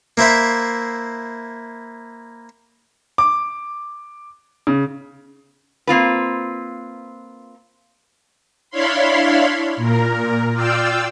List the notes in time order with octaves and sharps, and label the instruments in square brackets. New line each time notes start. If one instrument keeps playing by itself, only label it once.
[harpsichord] A#3 E4 C5 E5
[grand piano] D6
C#3
[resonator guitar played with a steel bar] A#3 C4 F4 B4
[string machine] D4 E4 C#5 F5 B5 C6
A#2 A#4
F4 D5 F5 G5 E6